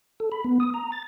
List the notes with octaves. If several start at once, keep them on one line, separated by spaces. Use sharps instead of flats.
A4
B5
B3
D#6
A#5
A6